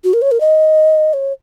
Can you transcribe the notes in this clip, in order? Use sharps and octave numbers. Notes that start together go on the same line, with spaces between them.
F#4
A#4
C#5
A#4
D#5
C#5